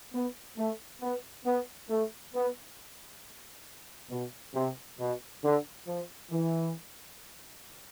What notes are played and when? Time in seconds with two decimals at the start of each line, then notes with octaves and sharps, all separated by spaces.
0.13 B3
0.57 A3
1.01 B3
1.45 B3
1.89 A3
2.34 B3
4.10 B2
4.54 C3
4.99 B2
5.43 D3
5.86 F3
6.31 E3